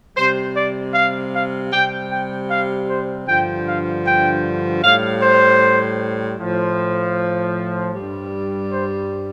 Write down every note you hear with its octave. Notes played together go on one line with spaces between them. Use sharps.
C3 G3 C5
D5
F5
F5
C3 G3 G5
G5
F5
C5
G2 D3 F3 G5
F5
G5
A2 G3 F5
C5
A2 F3
G2 G3
C5